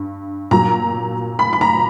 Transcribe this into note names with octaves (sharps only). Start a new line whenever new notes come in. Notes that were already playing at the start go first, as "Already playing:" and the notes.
Already playing: G2
A#2 F#3 A#5
B5
B5
A#5